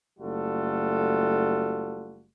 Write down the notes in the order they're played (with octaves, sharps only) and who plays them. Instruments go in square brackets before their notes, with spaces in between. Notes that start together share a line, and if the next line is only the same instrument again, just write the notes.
[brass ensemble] F#1 G3 A3 F4 F#4 A4